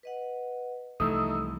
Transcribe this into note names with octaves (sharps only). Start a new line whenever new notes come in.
B4 D#5 F#5
C2 E3 F3 A3 D#4 A4 D#6 E6